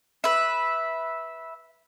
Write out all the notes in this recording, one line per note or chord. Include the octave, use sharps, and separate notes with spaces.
B4 E5